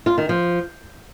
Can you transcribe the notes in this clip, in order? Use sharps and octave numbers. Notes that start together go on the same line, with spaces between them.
F4
D#3
F3